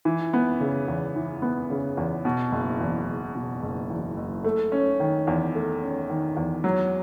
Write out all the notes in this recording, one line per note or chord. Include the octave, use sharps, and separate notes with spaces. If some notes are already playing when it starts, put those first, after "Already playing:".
E3
B3
C#3
E2
E3
B3
C#3
E2
B2
F#1
E2
F#1
B2
F#1
E2
F#1
A3
C#4
D#3
E2
A3
C#4
D#3
E2
F#3